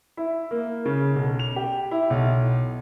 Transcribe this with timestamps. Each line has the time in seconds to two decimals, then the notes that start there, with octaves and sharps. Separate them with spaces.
0.17 E4
0.51 A#3
0.85 C#3
1.16 B1
1.39 F7
1.56 G4
1.91 E4
2.10 B1